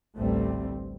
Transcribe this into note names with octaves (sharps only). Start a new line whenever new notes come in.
A1 D2 G3 A3 C4